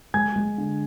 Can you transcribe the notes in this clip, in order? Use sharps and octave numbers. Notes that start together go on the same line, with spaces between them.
G#3 G#5 G#6
G#3
D3